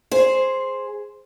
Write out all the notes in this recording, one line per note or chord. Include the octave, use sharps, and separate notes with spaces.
G#4 C5